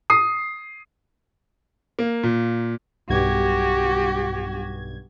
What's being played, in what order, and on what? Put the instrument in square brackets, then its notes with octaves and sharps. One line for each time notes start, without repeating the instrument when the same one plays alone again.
[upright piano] D#6 C7
[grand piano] A#3
A#2
[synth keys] B1 G2 G#6 [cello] F#4 G4